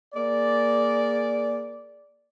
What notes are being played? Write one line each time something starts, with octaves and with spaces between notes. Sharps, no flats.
A#3 G#4 D5